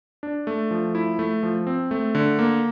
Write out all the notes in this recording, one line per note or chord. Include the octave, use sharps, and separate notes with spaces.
D4
A3
F3
E4
A3
F3
C4
A3
D3
A#3